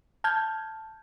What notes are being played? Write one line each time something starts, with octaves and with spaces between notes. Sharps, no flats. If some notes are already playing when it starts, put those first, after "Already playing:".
A5 F6 G6 G#6